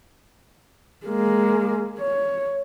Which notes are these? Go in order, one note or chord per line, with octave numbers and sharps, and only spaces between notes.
G#3 A#3
C#5